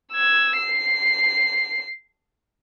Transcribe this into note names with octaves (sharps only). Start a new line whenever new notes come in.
E6 G#6
C7